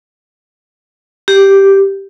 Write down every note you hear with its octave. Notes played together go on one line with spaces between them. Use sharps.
G4